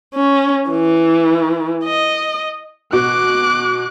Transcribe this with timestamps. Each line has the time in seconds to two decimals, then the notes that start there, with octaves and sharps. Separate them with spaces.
0.15 C#4
0.70 E3
1.85 D#5
2.93 B2 D6 F#6